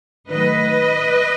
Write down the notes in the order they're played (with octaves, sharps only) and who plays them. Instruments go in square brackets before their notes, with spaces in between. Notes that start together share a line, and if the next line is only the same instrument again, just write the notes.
[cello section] D#3 F#3 A3 B4 D#5